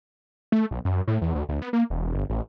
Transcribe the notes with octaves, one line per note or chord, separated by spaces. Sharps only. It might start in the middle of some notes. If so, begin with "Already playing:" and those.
A3
B1
F#2
A2
E2
D2
D2
B3
A#3
E1
G1
A1